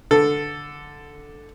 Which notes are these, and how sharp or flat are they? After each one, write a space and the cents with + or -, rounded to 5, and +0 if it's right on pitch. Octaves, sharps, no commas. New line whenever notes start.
D3 +0 A4 +0